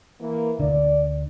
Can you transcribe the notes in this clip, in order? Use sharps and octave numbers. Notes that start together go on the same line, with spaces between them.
E3 A#3
D2 D3 D5